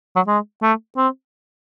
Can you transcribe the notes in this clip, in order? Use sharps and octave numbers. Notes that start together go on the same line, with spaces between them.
F#3
G#3
A3
C4